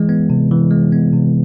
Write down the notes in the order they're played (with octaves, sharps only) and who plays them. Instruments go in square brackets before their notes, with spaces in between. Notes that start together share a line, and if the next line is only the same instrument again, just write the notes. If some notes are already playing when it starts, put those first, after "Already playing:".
Already playing: [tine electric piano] E3 G#3
B3
C3
E3
G#3
B3
C3